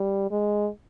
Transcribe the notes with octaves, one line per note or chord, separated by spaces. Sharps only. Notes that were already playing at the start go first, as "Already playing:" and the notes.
Already playing: G3
G#3